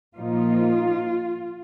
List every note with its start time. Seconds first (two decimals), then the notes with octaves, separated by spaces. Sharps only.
0.16 A#2 F3 A#3 D#4 F4